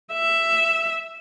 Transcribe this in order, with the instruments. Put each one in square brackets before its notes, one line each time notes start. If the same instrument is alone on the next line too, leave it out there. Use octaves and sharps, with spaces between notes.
[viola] E5